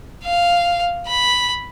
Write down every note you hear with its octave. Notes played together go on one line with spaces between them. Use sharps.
F5
B5